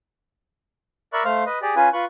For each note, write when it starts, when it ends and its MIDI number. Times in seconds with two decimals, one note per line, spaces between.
1.13 1.23 70
1.13 1.23 74
1.13 1.23 76
1.13 1.23 83
1.13 1.23 85
1.13 1.23 90
1.25 1.44 57
1.25 1.44 72
1.25 1.44 77
1.25 1.44 89
1.46 1.59 71
1.46 1.59 75
1.62 1.75 67
1.62 1.75 68
1.62 1.75 74
1.76 1.89 61
1.76 1.89 65
1.76 1.89 71
1.76 1.89 80
1.93 2.05 65
1.93 2.05 71
1.93 2.05 85
1.93 2.05 90